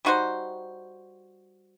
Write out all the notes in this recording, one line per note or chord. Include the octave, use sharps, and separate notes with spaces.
G3 D#4 F#4 C5